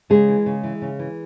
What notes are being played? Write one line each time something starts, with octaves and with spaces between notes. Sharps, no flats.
C#3 G#3 G#4
E3
C#3
E3
C#3
E3